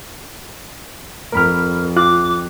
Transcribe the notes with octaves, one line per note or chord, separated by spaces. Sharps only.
F2 A#4 B5 F6
F4 D6 F#6